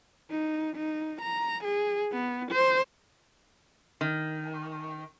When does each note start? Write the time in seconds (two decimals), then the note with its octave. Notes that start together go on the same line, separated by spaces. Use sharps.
0.31 D#4
0.76 D#4
1.22 A#5
1.64 G#4
2.12 B3
2.52 C5
4.01 D#3